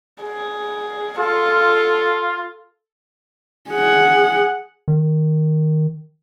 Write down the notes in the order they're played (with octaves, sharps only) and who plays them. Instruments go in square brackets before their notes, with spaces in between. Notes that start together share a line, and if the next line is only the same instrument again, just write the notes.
[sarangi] G#4
[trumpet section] F4 [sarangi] A4
[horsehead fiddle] G#4 F#5
[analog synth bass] D#3